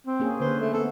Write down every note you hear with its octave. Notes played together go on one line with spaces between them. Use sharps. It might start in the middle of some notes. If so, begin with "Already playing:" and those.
C4
A#3 C#4 G#4
D3 B4 C5
A3
B3 A4